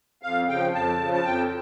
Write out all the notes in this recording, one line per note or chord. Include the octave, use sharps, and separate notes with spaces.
F2 F5
C#3 F3 G5
F2 A5
C#3 F3
A5
F2 G5